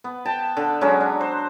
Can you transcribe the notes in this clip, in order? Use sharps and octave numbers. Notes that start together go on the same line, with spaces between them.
B3
G5 A5
D3
F#3 G#3 C#4 F#4
D4
C5